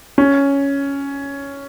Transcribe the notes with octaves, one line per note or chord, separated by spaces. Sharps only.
C#4